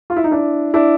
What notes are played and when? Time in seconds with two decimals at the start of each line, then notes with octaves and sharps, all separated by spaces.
0.10 F4
0.16 E4
0.24 D#4
0.31 D4 E4
0.74 D4 E4